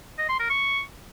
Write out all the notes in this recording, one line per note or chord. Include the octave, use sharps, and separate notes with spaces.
D#5
C6
A#4
C#6